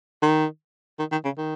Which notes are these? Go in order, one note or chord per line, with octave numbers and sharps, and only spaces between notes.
D#3
D#3
D#3
C#3
D#3